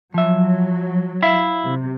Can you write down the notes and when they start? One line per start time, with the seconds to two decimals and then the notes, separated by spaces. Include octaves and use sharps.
0.14 F3 F#3 E5
1.23 E4 E5 F5
1.65 C3